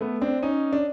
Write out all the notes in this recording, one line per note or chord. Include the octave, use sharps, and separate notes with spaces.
A3 B3
C4 D4
C#4 D#4
D4